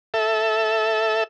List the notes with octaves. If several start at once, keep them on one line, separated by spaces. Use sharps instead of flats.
A4 E5